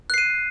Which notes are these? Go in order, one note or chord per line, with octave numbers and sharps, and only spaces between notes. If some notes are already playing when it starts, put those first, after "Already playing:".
F#6 C7 D#7